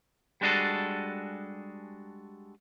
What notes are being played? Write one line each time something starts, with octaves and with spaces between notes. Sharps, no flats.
G3 G#3 D4 F#4 G#4 A4